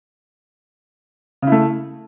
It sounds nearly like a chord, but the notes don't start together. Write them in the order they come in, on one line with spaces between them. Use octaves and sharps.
C#3 E4 A3